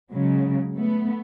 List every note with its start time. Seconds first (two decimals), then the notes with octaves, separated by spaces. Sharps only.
0.13 C#3 F#3 G#3
0.74 A3 B3